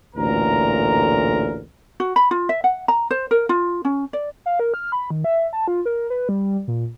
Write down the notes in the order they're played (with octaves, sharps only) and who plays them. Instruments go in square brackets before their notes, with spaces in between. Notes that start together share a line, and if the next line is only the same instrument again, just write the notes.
[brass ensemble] A1 D2 A#2 A#4 A#5
[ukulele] F#4
B5
F4
E5
F#5
A#5
C5
A#4
F4
C#4
D5
[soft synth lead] F5
A#4
F6
B5
D#3
E5
A5
F4
A#4
B4
G3
A#2